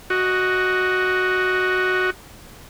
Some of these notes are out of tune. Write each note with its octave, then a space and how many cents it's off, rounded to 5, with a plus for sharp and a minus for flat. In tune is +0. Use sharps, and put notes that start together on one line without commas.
F#4 +0 D#5 +0